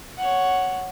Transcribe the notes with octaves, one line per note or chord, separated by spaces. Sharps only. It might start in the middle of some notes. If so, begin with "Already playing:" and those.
C#5 F#5